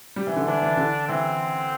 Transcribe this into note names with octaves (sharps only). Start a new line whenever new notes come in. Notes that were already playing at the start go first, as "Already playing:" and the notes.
G3
E3
D3
E3 D4
E3
D3
E3 C4